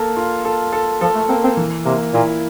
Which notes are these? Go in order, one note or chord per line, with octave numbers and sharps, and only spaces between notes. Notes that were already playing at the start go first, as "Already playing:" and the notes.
Already playing: A#3 A4
F4
A4
A4
F3 A4
A3
A#3 C4
C4
E3
C3 A#3
A#2 E4